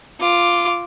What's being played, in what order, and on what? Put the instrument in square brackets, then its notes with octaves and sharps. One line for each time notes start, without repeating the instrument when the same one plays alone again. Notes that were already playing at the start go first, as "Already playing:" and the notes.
[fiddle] F4 D6